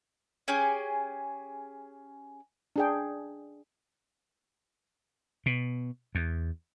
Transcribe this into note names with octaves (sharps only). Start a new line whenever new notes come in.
C#4 G4 G#4 G#5
D4 G#4 G5
B2
E2